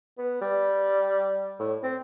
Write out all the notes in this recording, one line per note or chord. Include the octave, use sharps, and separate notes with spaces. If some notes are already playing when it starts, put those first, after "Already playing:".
B3
G3
A2
C4